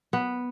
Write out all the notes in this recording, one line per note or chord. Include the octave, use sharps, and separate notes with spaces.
B3